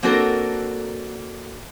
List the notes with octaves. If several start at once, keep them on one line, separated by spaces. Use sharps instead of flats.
A#3 C4 D4 F#4 A4 A#4